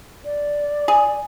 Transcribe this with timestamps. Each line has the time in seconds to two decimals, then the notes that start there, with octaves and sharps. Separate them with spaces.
0.25 D5
0.88 G#4